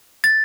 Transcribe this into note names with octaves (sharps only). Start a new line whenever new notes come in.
A6